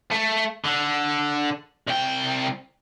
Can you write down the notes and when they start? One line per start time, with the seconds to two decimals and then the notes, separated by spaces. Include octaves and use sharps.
0.11 A3
0.64 D3
1.87 C2 G5